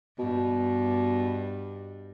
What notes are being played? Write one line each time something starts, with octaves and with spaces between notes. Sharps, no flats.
G2 B2